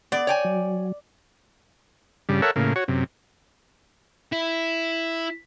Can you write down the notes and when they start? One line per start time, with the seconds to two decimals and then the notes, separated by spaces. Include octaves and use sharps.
0.12 B3 D5
0.27 C#5 G5 G#5
0.44 F#3
2.29 G2 C#3 G3
2.42 A4 A#4 C#5 E5 F#5
2.56 A2 C#3 A#3
2.76 F#4 C#5
2.88 F#2 C3
4.32 E4